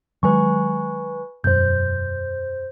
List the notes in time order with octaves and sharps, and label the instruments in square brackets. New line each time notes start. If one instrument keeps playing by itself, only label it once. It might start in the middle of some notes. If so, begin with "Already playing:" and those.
[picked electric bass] D#3 F#3 G#3 [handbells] B4 G#5 C#6
[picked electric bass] E1 F#2 [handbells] C5 G6